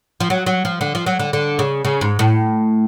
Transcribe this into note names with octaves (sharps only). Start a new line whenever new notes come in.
F3
F#3
F#3
F3
D3
F3
F#3
D3
D3
C#3
C#3
G#2
A2